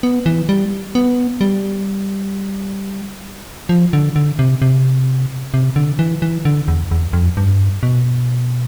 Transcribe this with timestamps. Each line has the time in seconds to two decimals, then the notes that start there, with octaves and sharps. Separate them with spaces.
0.03 B3
0.26 E3
0.49 G3
0.95 B3
1.41 G3
3.69 F3
3.93 D3
4.16 D3
4.39 C3
4.62 C3
5.54 C3
5.76 D3
5.99 E3
6.22 E3
6.45 D3
6.68 E2
6.91 E2
7.13 F2
7.37 G2
7.83 B2